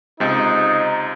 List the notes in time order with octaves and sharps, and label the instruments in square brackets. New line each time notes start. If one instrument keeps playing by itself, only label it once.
[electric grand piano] C#2 C3 [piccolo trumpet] D#4